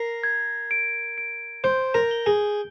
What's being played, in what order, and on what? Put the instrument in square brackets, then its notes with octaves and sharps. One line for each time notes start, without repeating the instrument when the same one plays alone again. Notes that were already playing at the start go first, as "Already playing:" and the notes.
Already playing: [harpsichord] A#4 [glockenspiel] C7
[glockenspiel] G#6
D7
D7
[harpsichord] C5 [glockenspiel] G6
[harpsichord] A#4
[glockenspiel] G7
[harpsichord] G#4